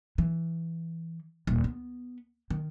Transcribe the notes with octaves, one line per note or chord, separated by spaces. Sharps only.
E3
D#1
B3
D#3